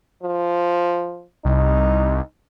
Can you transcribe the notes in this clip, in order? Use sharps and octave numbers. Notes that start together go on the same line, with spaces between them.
F3
C2 D#4